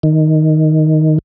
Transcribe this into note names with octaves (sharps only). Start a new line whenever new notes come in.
D#3